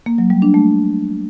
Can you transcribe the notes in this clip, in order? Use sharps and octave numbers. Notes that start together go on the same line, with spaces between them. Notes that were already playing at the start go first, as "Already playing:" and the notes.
A#3
F#3
G3
D4
A3